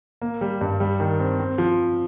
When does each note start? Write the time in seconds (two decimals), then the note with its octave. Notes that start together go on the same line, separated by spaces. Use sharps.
0.22 A#3
0.41 G3
0.61 G2
0.80 G3
1.00 D#3
1.20 C4
1.39 C4
1.58 F3